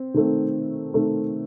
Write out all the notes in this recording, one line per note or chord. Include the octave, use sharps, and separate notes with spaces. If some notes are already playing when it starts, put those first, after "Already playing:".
Already playing: C4
D#3 A3 C4
D#3 A3 C4